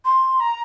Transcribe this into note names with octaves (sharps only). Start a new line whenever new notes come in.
C6
A#5